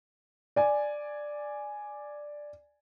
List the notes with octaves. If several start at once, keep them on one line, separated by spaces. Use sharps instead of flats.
D5 G#5